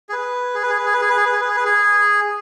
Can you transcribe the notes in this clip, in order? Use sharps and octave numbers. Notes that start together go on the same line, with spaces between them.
G#4
B4
G#4
B4
G#4
B4
G#4
B4
G#4
B4
G#4
B4
G#4
B4
G#4
B4
G#4